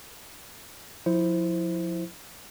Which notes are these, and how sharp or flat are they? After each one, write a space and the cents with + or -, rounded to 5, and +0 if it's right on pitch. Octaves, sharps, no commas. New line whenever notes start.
F3 +30 E4 +0 C5 +0